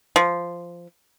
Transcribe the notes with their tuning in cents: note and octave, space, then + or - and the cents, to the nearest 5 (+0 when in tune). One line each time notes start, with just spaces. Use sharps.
F3 -10